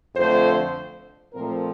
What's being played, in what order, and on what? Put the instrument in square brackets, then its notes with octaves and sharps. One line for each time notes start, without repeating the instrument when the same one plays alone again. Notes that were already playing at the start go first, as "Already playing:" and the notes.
[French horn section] F2 D3 F3 A3 C5
A#2 F3 A3 C4 A#4